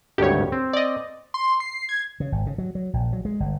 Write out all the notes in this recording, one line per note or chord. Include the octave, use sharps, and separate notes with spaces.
G#1 D2 G2 G4 C#5
C4
D5 D#5
C6
C7
G#6
C#3
G#1
C#3
F#3
F#3
A#1
F#3
G#3
G1